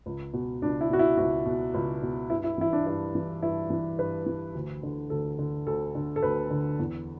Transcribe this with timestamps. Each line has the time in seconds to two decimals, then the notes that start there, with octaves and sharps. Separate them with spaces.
0.06 C#2
0.33 B2
0.62 C#2 D4
0.81 E4
0.89 B2 F#4
0.99 E4
1.17 C#2 F#4
1.46 B2
1.74 C#2
2.02 B2
2.30 G2 E4
2.44 E4
2.58 E3 E4
2.73 D4
2.86 G2 E4
3.15 E3
3.42 G2 E4
3.70 E3
3.98 G2 B4
4.26 E3
4.55 D2
4.83 D3
5.10 D2 A4
5.39 D3
5.66 D2 A4
5.95 D3
6.16 A4
6.23 D2 B4
6.50 D3
6.79 E2